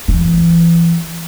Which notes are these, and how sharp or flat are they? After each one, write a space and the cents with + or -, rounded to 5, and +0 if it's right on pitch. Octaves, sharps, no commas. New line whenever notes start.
E3 +35